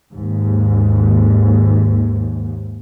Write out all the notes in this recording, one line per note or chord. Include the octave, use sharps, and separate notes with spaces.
D#2 G#2